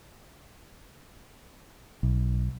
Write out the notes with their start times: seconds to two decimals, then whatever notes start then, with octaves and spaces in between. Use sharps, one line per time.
2.03 B1